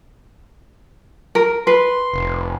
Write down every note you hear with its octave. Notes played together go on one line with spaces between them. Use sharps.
A#4
B4 C6
F1